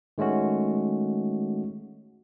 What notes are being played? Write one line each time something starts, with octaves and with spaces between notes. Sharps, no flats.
D#3 G#3 A3 C#4 F#4